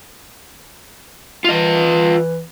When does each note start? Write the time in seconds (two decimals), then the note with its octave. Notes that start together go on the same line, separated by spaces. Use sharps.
1.44 E3 F4 D#5